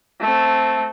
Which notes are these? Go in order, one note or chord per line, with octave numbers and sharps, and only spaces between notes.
A3 C4